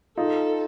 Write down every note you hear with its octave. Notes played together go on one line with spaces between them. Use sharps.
D#4 F4 A4